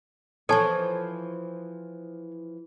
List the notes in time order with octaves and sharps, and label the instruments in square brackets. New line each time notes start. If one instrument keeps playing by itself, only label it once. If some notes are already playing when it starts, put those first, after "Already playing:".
[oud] E3 F3 [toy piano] A4 A5 [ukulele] C#5